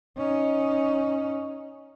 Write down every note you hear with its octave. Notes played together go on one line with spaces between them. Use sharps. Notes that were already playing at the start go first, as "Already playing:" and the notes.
C#4 D#4